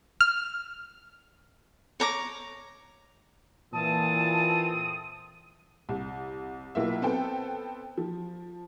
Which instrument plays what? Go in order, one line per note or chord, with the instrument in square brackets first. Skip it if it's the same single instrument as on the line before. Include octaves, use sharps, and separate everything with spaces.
[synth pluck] F6
[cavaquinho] C#5 A#5 D6
[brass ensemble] A#2 E3 [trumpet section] C4 A4 D#6 [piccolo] A5
[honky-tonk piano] C2
B1 A#3 E4 F4 E5
B3 C4 A4 G5
F3